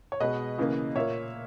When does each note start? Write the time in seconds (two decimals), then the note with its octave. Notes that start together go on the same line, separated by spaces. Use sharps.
0.12 C#5
0.20 B2 G#3 B3 B4 D#5
0.58 C#3 E3 A#3
0.96 A#2 A#3 C#5 E5